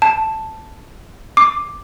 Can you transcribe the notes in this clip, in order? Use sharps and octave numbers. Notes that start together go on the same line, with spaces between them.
A5
D6